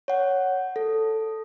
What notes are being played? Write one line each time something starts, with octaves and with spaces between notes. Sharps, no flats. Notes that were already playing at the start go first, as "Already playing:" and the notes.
C#5 F#5
A4